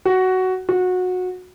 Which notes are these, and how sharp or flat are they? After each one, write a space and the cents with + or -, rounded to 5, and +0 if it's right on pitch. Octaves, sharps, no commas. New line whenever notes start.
F#4 +10
F#4 -20